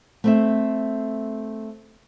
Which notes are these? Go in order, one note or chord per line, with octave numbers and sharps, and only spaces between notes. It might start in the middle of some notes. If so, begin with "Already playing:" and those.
A3 C4 E5